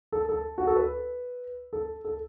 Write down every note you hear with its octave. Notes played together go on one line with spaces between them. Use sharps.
A4
A4
F#4
A4
B4
A4
A4